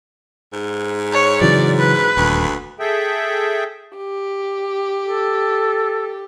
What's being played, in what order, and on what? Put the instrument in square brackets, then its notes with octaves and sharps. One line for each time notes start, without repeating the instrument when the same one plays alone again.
[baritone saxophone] G#2
[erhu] C#5
[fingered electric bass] C#3 E3 F#3 [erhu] D5
[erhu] B4
[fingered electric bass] D#1 [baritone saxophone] D2
[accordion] G#4 A4 E5 G5
[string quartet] G4
[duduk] A4